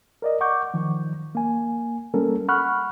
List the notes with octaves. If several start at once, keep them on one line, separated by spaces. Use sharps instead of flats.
A#4 D5 D#5
F#5 C#6 D6 G6
D#3 F3
A#3 G#5
G3 A#3 B3 C#4 A4 A#4
F#5 B5 C#6 F6 F#6